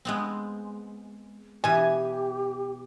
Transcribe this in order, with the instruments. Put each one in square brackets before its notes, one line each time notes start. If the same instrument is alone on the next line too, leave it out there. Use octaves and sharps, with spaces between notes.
[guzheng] G#3 B3 C4
[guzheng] B2 E3 [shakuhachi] G4 [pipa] G#5